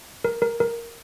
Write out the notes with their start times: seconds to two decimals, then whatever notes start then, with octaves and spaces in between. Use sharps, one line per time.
0.24 A#4
0.42 A#4
0.60 A#4